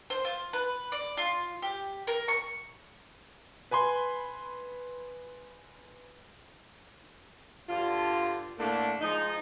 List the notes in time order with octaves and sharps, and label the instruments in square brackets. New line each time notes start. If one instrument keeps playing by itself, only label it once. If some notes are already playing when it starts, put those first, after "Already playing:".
[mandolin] C5
F4
B4
D5
F4
G4
A#4
C#6
[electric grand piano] B4 G#5 B5 C6
[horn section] G2 D3 F4
A2 D3 A3 A#3 D4
F3 G#3 D#4